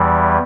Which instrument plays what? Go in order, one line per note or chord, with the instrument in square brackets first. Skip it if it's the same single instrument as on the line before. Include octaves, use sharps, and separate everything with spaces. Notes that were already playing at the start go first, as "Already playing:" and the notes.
Already playing: [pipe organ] E2 E3 G3